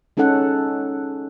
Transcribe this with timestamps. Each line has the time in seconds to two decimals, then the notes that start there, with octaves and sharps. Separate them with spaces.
0.17 G#3 C#4 D#4 A4 F#5